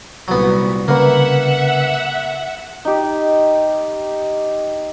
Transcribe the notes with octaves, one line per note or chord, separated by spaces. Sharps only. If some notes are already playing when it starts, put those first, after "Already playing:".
C2 A#2 F#3 B3
C#3 A#3 B4 E5 F#5
D#4 G4